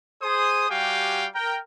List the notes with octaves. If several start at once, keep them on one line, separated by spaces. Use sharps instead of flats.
G#4 C5 D#6
G3 F#4 G4 F5 G5 G#5
A#4 G5